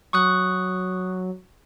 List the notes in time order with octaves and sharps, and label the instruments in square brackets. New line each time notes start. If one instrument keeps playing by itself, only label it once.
[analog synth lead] F#3 [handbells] C#6 D#6 F#6